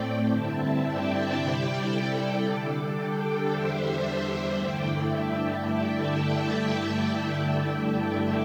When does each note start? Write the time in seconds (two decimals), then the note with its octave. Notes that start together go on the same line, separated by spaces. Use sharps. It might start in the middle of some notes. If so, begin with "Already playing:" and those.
Already playing: A2 A3 C4 D5 G5
0.29 G2 D3 C4 E4 E5 A5
0.82 D5 G5
1.35 C3 G3 E4 D5 G5
1.89 A4 D5
2.42 D3 G3 D4
2.96 D5 G5
3.49 E2 D3 G3 D4 C5 E5
4.56 G2 D3 A3 E4 D5 G5
5.10 E5 A5